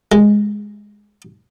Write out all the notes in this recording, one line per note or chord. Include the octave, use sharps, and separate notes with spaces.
G#3